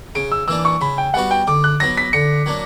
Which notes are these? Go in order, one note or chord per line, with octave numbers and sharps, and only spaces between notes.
C#3 D7
E6
E3 A#3 D4 E6
C#6
C#3 B5
G5
G3 B3 F#4 F#5
G5
D3 D6
F#6
F#3 B3 A#6
B6
D3 C#7
F#3 A#3 D4